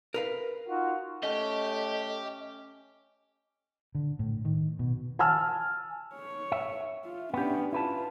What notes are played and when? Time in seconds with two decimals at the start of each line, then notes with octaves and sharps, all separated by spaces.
0.14 A#4 B4 F5
0.69 D#4 F4 F#4
1.23 A3 C#4 G4 D#5
3.95 D3
4.19 A2
4.45 D#3
4.79 B2
5.19 G#5 A5 E6 F6
6.15 C#5
6.52 E5
7.05 F4
7.34 B3 C#4 D4 G4
7.73 E4 F4 B4 A5